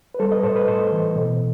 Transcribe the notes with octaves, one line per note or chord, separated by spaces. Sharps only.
B4
G3 A4 C5
B4 D#5
A2 A4 C5
B4 D#5
A2 A4 C5
E3
B2